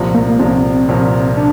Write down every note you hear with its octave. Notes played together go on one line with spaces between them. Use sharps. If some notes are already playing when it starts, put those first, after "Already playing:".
Already playing: C2 A#2 F3
A#3
C2 A#2 F3 C4
C2 A#2 F3
D4